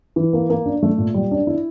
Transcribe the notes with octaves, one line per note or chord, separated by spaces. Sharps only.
E3
A#3
A#3
D4
A3
A#2
G3
D4
E4